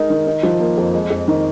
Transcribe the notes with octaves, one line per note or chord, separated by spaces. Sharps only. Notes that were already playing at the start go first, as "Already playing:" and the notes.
Already playing: G#3 D#4 A#4
D#3
D#4
F3
A#3
F2
G#3
F2
D#3